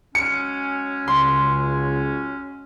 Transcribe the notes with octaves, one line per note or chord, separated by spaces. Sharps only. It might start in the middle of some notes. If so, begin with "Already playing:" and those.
F#3 G#3 C#4 C#7
C#2 C6